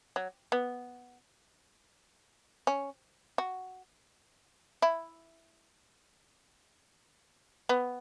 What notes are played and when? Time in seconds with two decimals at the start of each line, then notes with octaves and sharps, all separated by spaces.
0.16 F#3
0.52 B3
2.67 C#4
3.38 F#4
4.82 E4
7.69 B3